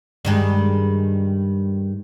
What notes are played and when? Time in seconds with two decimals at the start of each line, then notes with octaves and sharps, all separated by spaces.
0.25 G2 D#3 G#3